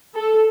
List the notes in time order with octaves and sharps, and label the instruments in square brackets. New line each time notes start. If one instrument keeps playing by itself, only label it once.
[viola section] A4